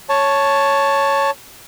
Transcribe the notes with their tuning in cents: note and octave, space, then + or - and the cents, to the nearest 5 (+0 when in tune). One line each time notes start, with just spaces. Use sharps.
C#5 +0 A5 +0